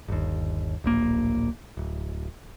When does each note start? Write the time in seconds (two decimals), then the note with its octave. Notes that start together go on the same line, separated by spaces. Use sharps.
0.08 G1 D#2
0.84 D1 A#1 A#3
1.77 D1